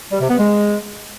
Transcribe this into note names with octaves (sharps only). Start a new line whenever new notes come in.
G3
C3
B3
G#3